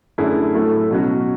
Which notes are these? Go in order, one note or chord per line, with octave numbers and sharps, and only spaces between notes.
F#2 D3 A3 E4 G#4
A2 F#3 A3 E4 A4
B2 F#3 C#4 F#4